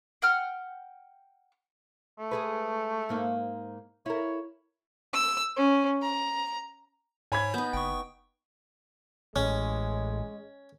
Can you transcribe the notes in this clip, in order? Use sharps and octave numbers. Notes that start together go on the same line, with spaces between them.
F#5 G5 F6
A3
G#3 G#4 B4
G#2 A#3 D#4
E4 A#4 C#5
E6
C#4
A#5
G#2 C#5 G#5 B5 G#6
B3 D#4 G6
F#1 G5 C#6
A1 G#3 C#4